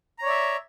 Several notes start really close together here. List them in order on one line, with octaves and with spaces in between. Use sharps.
A#5 C#5 D5 E5